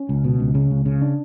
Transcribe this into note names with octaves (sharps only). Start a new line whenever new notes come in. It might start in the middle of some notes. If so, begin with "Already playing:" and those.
Already playing: C#4
C#2
B2
C#2
C#3
C#2
C#3
D4